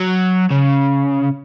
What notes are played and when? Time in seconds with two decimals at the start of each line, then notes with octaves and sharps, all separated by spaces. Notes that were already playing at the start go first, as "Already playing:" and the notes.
Already playing: F#3
0.51 C#3